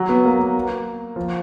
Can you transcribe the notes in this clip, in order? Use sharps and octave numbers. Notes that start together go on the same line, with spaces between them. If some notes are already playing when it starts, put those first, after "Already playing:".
Already playing: F#3
B3
A#3
A#3
F3